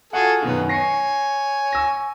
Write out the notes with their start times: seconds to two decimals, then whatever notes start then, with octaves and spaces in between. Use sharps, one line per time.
0.13 F4 F#4 G#4 A4 F#5
0.43 F#2 B2 D#3 B3
0.69 C#5 G#5 A#6 C7 C#7
1.72 C#6 E6 A#6